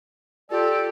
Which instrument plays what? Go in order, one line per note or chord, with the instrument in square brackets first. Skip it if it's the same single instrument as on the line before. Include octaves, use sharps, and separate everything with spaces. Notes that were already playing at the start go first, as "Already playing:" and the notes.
[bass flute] F4 [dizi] G4 [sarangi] A4 [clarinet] D5